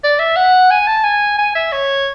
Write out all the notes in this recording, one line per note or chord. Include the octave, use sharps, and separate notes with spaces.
D5
E5
F#5
G#5
A5
G#5
G#5
E5
C#5